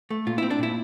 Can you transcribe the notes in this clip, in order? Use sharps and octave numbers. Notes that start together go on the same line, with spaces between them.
A3
A#2 F4
E4
C4
D4
A#2 E4